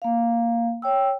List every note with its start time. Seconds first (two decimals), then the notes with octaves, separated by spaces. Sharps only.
0.02 A#3 F5
0.82 C#5 G5 E6